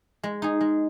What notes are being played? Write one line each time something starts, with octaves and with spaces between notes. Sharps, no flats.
G#3
D#4 G#4
G#3